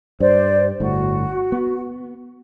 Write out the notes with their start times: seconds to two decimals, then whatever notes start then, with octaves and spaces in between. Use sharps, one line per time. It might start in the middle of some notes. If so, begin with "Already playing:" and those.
0.20 G2 C5 D5
0.80 G1 A2 F#4
1.52 B3